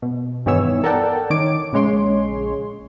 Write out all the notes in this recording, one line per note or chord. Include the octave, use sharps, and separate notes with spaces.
B2
G2 D#3 E3 B3 C#5 E6
A4 A#4 D5 F#5 G5 A5
D#3 D#4 C#5 D6 D7
A#1 C#3 G#3 C#5 C6